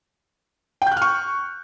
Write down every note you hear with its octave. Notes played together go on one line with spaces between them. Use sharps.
G5
G6
F#6
F6
C#6